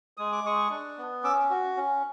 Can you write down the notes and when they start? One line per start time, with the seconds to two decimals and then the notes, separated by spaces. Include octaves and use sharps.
0.17 G#3 D#6
0.32 D6
0.44 G#3 C#6 D#6
0.70 D4
0.98 B3
1.23 C#4 D6 E6
1.50 F#4
1.77 C#4